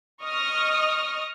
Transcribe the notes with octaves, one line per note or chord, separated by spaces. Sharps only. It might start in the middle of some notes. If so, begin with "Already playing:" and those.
D#5 C#6 D#6 F6